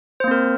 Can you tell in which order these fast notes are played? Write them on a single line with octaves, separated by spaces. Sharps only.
C5 A#3 C4 A#4